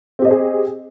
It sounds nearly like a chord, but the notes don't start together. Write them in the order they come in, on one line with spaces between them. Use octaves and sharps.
C4 G4 D#5 C5 G#4